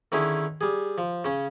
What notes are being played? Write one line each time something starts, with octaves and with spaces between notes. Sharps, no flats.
D3 D#3 C#4 E4 G#4
G3 G#4
F3
C#3 C#4